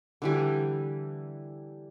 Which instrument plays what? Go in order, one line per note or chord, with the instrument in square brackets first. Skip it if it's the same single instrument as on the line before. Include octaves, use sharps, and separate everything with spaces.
[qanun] D3 E3 G3